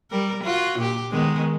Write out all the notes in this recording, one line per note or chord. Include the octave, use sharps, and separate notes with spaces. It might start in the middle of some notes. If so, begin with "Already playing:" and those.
G3 A#4
F4 F#4
A#2 G4
D#3 G#3 B3